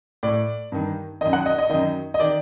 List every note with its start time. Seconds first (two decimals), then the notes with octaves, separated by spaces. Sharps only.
0.23 A2 D5
0.72 G2 D#3
1.21 F#2 D#3 D#5
1.33 F#5
1.46 D#5
1.58 D#5
1.69 F#2 D#3 D#5
2.14 D#5
2.20 D#3 D5